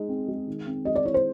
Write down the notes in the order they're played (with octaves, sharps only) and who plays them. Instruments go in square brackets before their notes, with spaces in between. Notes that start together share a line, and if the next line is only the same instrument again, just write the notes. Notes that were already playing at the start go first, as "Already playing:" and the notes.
Already playing: [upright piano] G#3 D#4
C4
G#3
D#3
C4
[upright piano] G#3 [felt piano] D#5
[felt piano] D5
[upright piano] E4 [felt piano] C#5
[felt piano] C5